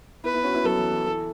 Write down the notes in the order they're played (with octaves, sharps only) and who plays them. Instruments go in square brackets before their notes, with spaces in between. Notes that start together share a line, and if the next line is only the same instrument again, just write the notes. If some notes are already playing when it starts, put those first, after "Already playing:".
[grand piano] B3 E4 [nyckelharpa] B4
[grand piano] B3 E4
C#4 F#4
B3 E4
[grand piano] F#3 B3 [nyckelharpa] A4
[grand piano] E3
E3
E3